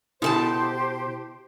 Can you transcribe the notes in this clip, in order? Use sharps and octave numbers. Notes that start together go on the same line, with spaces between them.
B2 E4 G4 A4 C5 A5